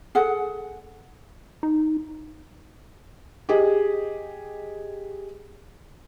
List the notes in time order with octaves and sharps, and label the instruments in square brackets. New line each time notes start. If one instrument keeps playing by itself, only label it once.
[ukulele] G#4 A4 F#5
[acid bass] D#4
[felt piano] G4 G#4 D#5